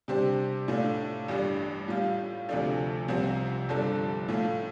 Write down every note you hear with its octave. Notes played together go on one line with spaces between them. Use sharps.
C3 G3 D4 G4 C5
A2 A3 D4 F4
A1 G2 G3 D4
A2 G3 F4
D2 C3 F3 A3 D4
C2 C3 F3 C4
G1 G2 F3 D4 A4
A2 A3 F4